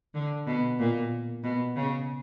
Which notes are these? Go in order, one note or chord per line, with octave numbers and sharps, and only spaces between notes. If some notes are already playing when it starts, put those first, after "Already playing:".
D3
B2
A#2
B2
C#3